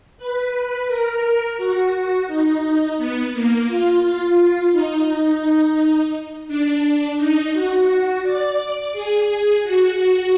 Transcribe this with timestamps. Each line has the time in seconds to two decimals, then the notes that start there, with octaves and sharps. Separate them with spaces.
0.18 B4
0.87 A#4
1.57 F#4
2.28 D#4
2.97 B3
3.33 A#3
3.67 F4
4.02 F4
4.72 D#4
6.48 D4
7.17 D#4
7.53 F#4
8.23 D5
8.92 G#4
9.63 F#4
9.97 F#4